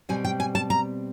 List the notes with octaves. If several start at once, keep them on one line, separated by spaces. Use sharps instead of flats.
B2 G3 C4 G#5
G5
G#5
A5
A#5